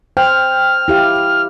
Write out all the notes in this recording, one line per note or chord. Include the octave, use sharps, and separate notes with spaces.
C5 G5 F6
E4 G4 F5